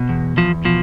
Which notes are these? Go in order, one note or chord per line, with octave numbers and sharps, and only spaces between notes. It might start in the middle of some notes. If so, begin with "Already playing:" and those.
Already playing: B2
E2
E2 F3
B2 F3